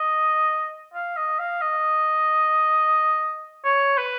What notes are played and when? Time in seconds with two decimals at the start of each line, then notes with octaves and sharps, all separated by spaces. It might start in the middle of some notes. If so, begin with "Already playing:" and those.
Already playing: D#5
0.94 F5
1.16 D#5
1.39 F5
1.61 D#5
3.64 C#5
3.98 B4